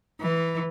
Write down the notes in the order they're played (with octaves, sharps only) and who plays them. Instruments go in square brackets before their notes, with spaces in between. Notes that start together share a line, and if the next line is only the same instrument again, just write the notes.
[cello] E3